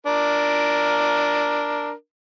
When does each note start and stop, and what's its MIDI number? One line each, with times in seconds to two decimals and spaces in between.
0.06 1.92 62
0.06 1.92 70